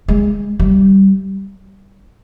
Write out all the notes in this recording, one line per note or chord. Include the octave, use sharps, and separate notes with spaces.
G#3
G3